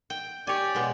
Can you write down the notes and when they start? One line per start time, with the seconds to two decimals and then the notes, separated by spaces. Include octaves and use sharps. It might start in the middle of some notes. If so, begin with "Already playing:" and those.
0.10 G5
0.47 G4 C#5 D5 G#5
0.75 B2 G#3